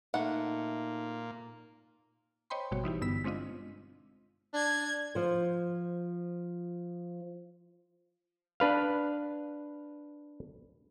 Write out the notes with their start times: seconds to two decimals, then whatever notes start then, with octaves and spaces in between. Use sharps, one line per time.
0.14 A#2 A3 A#3 D#4 F#5
2.50 C5 C#5 D#5 G5 B5 C6
2.71 G#1 B2 G3 F#4 C#5
2.84 E3 D#4 E4 G4
3.01 G2 D3 B3 E6 B6
3.24 G#3 C4 D4 F4 D#5
4.54 D4 G#6
5.15 F3 C5
8.60 D4 B4 F5